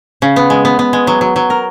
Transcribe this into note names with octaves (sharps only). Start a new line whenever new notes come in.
C#3
B3
G#3
B3
B3
G#3
F#3
F#3
F#3
A#4